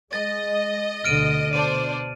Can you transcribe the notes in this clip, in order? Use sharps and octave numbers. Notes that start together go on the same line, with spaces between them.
G#3 D#5 A6
D2 B2 D3 F6 D7 D#7
B2 D4 C5 D5 D#7